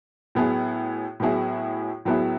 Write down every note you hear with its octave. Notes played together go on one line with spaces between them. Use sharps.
A2 F#3 B3 E4 G#4
A2 F#3 B3 E4 G#4
A2 F#3 B3 E4 G#4